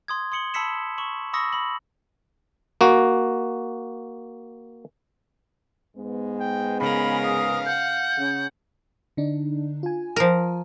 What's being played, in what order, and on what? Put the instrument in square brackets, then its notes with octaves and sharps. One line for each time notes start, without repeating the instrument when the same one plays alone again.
[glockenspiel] C6 D#6 G#6
C6 D#6 C#7 F#7 G7
A5 B5 E6 B6 C#7 E7
C#6 E7 F#7
B5 C#6 D#6 E6 A#6 C#7
B5 F#7
[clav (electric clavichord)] A#3 F#4
[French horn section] G#2 G#3 B3
[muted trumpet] G5
[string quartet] C#3 A#4 [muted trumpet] F5 [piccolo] B5
[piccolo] D#6
[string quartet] F#5 [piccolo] G6
[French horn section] C#3
[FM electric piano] D3 D4 D#4
F4 G#5
[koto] F3 A#4